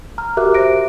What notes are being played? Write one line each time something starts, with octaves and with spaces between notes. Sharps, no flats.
A#5 F6
F#4 G4 A#4 E5 D6 F#6
C5 E5 A#6 D7